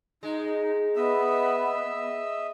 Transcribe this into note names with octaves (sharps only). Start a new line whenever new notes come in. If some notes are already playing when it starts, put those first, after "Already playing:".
G#3 D#4
B3 D#5 E5 E6